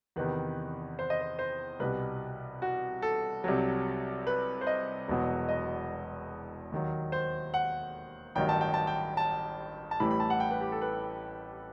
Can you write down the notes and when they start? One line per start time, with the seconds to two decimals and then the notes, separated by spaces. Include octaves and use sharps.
0.16 E2 C3 D#3 B4
0.99 C5
1.10 D#5
1.21 C5
1.39 C5
1.80 C2 B2 G3 B4
2.62 F#4
3.02 A4
3.44 C2 C3 F#3
4.27 B4
4.61 C5
4.67 D#5
5.08 E1 E2 B2 F#3
5.49 D#5
6.72 D#2 D#3 F#3
7.12 C5
7.54 F#5
8.35 A1 G2 D#3 F#3 G5
8.49 A5
8.61 G5
8.74 A5
8.87 G5
9.17 A5
9.91 A5
10.00 A1 A2 E3 G3 B5
10.11 B5
10.20 A5
10.30 F#5
10.40 G5
10.51 B4
10.61 G4
10.72 A4
10.82 B4